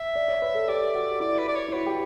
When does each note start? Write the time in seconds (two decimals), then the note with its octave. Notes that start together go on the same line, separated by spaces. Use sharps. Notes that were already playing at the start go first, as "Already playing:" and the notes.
Already playing: E5
0.15 D5
0.28 C#5
0.42 B4
0.55 A4
0.68 G4 D5
0.95 F#4
1.20 E4 D5
1.38 B4
1.48 D5
1.56 C#5
1.68 E4
1.73 F#4 B4
1.86 G4